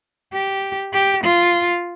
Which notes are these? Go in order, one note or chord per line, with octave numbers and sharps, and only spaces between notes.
G4
G4
F4